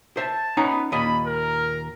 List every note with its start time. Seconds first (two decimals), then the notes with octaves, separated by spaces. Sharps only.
0.17 C5 E5 A5
0.57 B3 C#4 D#4 A#5
0.92 D#2 A#2 D#5 B5
1.25 A#4